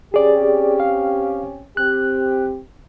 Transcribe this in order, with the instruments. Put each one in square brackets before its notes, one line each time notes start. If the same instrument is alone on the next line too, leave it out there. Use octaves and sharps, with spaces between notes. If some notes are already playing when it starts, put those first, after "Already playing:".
[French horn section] C4 C#4 G4 [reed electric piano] G#4 D5
[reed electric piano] F5
[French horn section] C4 G4 [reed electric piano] F#6